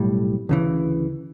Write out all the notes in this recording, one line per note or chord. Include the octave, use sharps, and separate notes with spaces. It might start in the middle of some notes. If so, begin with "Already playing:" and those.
Already playing: B1 A2 G3
D2 C#3 E3